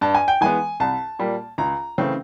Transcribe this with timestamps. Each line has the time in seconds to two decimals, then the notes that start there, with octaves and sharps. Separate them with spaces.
0.01 G2 A5
0.15 G#5
0.28 G5
0.41 E3 G#3 B3 G#5
0.80 C2 A5
1.19 A#2 G3 A#3
1.58 C#2 A#5
1.98 C#3 E3 A3 C4